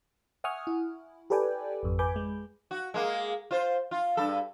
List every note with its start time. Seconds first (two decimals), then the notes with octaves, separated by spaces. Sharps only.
0.44 E5 F#5 G#5 C#6 D#6 F6
0.67 E4
1.30 G4 A4 B4 D5 G5 G#5
1.83 G#1 F2
1.99 B4 G#5 B5 D6 G6
2.16 G#3
2.71 F#4
2.94 G#3 A#3
3.51 F4 C5
3.91 F4
4.17 G2 A4